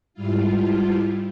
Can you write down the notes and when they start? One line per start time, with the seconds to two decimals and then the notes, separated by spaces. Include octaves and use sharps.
0.14 G#2 G3 E4 F4